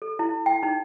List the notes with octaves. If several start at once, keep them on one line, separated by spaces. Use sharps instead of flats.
A4
E4
G5
D#4